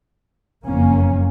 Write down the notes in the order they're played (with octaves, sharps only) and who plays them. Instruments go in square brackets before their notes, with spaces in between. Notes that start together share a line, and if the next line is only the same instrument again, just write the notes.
[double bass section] F#1 F2 A#3 C#4